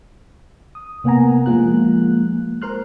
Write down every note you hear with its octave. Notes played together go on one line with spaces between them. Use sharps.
D#6
C3 A#3 B3 F#5 G#5 A#5
F3 G#3 A#3 F4 F#6
A#4 C5 C6 F6 F#6